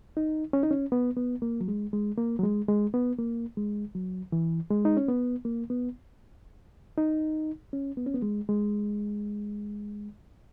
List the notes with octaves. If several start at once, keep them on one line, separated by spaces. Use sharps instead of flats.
D#4
C#4
D#4
C#4
B3
B3
A#3
F#3
G#3
G#3
A#3
F#3
G#3
G#3
B3
A#3
G#3
F#3
E3
G#3
D#4
C#4
B3
A#3
B3
D#4
C#4
B3
C#4
B3
G#3
G#3